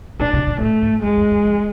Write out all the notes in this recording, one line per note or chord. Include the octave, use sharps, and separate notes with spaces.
B2 D4
C3
A#2
A2 A3
G#2
F#2 G#3
F#2
F2
F2